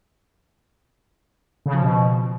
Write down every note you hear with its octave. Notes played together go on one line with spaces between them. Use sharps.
C#3
F3
B2